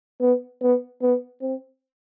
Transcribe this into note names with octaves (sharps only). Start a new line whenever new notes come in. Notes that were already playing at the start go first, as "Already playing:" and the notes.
B3
B3
B3
C4